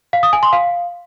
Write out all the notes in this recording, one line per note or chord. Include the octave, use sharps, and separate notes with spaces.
F5
D#6
G#5
C6
F5